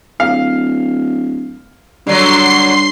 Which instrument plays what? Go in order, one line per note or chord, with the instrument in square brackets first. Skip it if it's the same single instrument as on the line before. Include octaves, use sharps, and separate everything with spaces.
[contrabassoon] D1 [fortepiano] F5
[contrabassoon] G2 [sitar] D3 F#3 [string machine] C6 C7